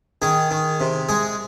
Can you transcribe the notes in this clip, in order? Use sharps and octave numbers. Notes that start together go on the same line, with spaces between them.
D#3 G#4
D#3
C3
G#3 G#4